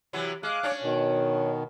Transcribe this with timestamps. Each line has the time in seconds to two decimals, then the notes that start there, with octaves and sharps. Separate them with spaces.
0.13 C3 E3 F#3
0.43 G#3 F5 D6 F#6
0.63 C#4 D4 C#5
0.82 B2 D#3